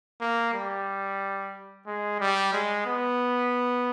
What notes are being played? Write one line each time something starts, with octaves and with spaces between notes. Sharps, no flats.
A#3
G3
G#3
G3
G#3
B3